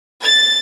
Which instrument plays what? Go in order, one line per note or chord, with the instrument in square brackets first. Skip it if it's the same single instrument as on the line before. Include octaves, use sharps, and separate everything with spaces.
[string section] A6